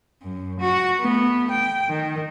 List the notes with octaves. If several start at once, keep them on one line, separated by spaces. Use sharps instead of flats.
F#2
F#4
A3 B3
G5
D#3